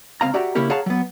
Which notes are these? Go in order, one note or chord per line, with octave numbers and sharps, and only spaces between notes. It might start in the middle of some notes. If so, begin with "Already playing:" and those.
C#2 C4 F5 A#5
F#4 G4 D5 E5 F#5 A#5
C#3 A#3 C#4 E4 G4 A#4
G#4 C#5 F5 F#5 A5 A#5
F#3 B3